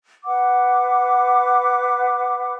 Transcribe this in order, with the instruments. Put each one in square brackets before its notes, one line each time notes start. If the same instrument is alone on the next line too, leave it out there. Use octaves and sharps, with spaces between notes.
[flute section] B4 F#5 D6